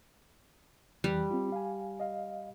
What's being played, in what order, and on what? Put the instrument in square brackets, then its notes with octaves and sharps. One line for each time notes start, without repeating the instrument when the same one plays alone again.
[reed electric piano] F2 E3 F#6 [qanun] G3
[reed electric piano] C4 F4
F5 G#5
D#5 F5